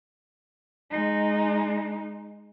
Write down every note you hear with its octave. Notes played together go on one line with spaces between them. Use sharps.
G#3 D#4